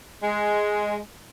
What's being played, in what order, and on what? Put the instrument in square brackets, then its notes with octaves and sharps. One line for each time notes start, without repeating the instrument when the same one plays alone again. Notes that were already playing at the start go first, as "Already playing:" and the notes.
[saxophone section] G#3